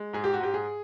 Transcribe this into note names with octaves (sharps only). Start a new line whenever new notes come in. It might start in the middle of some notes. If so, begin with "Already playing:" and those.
Already playing: G#3
G#2 G#4
G4
F#4
G#2 G4
G#4